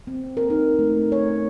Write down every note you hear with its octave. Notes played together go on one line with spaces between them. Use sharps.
C4
A#4
D#4
A3
C#5